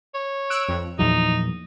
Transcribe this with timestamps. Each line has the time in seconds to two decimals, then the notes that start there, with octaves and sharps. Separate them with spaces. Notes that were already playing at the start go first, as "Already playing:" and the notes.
0.14 C#5
0.50 E6 F#6 D7
0.69 F2
0.99 E2 A#2 F3 F#3 D#4